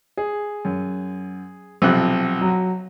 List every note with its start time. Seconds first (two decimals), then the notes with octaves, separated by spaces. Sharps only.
0.17 G#4
0.65 F#2
1.82 B1 C3 F3 F#6
2.41 F#3